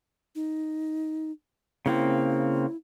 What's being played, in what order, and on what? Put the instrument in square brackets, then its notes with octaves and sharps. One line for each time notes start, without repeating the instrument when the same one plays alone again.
[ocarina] D#4
[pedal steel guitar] C#3 A#3 C4 [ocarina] E4